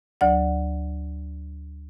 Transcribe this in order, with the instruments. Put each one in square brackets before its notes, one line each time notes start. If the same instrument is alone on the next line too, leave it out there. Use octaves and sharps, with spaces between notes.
[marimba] D2 F#3 D5 F#5